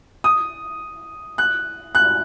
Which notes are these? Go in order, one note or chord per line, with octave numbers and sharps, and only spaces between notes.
D#6
F#6
F#6